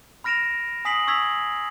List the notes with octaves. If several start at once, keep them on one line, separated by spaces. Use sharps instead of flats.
B5 F6 A#6 D7 E7 F7
G#5 D#6 B6 C7 F#7
C#6 D#6 E6 G#6 B6 F7